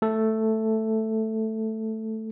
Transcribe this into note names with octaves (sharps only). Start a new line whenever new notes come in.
A3 A4